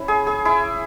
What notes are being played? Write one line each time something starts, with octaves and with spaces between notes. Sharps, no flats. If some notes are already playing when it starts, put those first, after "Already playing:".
Already playing: C#4 E4
G#4
G#4
E4